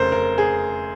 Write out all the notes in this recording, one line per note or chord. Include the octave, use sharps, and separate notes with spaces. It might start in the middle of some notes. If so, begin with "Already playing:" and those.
Already playing: F1 C#3 A#4 C5
A#4
G#4